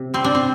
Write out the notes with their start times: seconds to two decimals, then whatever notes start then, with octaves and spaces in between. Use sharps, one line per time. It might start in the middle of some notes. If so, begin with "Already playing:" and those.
Already playing: C3
0.14 G3 C4
0.24 D4
0.35 C4